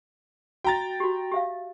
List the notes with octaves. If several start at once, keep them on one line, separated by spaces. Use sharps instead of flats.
F#4 G5 A#5 A6
F#4 G4
G4 E5 F5